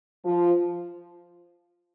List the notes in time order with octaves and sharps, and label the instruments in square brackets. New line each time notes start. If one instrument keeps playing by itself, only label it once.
[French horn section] F3